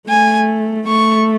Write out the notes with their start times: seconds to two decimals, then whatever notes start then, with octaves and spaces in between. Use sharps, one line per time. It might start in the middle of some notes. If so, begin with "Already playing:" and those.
0.09 A3 G#5
0.88 A3 C#6